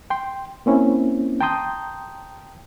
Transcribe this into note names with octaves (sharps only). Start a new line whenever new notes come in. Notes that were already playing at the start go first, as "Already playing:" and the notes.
G5 C6
A#3 C4 C#4 E4
G5 A5 A#5 C6 D#6 G6